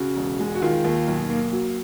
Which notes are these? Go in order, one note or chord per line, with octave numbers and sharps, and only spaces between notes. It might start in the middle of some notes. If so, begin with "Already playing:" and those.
Already playing: C#3 F#4
E1
G#3
F#4
D#3 F4
D#2
B1
A#3
F#3